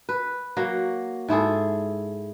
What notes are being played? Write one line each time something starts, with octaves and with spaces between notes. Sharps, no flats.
B4
F#3 A#3 F#4
G#2 E4 G#4 A4